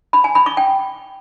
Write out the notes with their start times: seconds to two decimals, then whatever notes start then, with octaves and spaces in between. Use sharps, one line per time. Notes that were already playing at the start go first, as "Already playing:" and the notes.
0.13 B5
0.24 G#5
0.35 B5
0.46 D6
0.57 G5